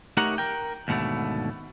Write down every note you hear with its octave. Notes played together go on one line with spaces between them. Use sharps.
A3 D#4 G4 A#4 C#5 F#5
A#4 G5
D#2 G#2 B2 D3 A3